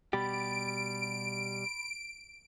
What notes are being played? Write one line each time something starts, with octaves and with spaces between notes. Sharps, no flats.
B2 G3 G4 B5 A6 D7